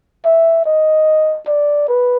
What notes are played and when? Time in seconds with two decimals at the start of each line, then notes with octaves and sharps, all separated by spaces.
0.25 E5
0.65 D#5
1.47 D5
1.88 B4